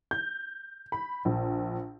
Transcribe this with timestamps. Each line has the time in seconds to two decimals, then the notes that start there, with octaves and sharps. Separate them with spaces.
0.11 G6
0.92 B5
1.25 A#1